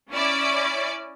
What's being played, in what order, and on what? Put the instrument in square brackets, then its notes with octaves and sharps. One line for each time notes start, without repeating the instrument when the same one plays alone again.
[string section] C#4 E4 D5